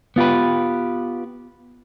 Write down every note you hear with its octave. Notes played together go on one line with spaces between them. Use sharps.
B3 F4 G4 B4